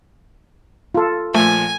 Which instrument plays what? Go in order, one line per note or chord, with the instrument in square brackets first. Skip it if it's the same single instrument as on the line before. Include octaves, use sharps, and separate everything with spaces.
[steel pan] F4 A4
[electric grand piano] A#2 F3 [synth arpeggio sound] A3 [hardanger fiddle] G#5